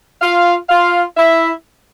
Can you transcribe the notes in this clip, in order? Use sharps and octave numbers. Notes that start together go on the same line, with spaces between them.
F4 F5
F4 F5
E4 E5